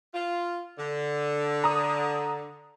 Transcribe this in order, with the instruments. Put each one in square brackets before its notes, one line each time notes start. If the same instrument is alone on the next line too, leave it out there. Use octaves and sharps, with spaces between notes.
[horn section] F4
D3
[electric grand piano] A#5 D#6